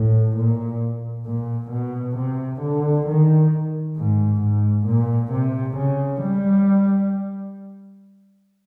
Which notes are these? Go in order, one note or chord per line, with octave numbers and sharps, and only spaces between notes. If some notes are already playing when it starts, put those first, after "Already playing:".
Already playing: A2
A#2
A#2
B2
C3
D3
D#3
G#2
G#2
A#2
C3
C#3
G3